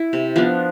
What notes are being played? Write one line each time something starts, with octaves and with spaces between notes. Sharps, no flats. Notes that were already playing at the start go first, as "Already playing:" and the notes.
Already playing: E4
C3
F3 B3 D4